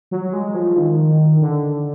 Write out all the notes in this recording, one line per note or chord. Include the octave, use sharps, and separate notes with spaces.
F#3
G#3
F3
D#3
D3